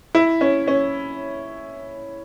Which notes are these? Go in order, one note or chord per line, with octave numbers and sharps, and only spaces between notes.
E4
C#4
C#4